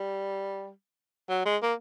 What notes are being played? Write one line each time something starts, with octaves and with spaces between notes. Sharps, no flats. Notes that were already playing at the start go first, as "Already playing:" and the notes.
Already playing: G3
F#3
G#3
A#3